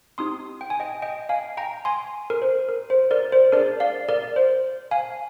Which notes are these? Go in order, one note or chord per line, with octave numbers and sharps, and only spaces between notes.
C4 D#4 G4 C6 D#6
G5
G#5
D#5 G5
D#5 G5
F5 G#5
G5 A#5
G#5 C6
A#4
C5
A#4
C5
A#4 D5
C5
D4 G#4 A#4 D5
D5 F5
A#4 D5
C5
F5 G#5